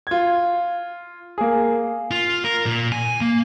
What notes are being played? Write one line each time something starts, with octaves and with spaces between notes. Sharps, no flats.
F4 G#6
A#3 G#4
F4
A#4
A#2
G#5
A#3